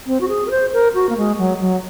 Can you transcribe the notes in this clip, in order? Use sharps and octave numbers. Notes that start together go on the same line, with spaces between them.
C4
F#4
G#4
A#4
C5
A#4
F#4
A#3
G#3
F#3
F#3